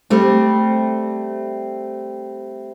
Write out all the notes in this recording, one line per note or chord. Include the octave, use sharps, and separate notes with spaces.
G3 A3 C4